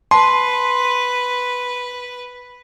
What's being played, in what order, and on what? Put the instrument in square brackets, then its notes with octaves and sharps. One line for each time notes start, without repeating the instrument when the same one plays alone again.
[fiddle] B4 [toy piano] A5 [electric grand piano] C6